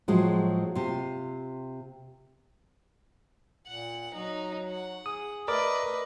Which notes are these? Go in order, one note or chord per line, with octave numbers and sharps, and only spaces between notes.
A2 F3 F#3 G#3 F4
C3 F4
A#2 F#5
F#3 D#4
F#5
G#4 D#6
A3 A#4 B4 D5 D#5 D6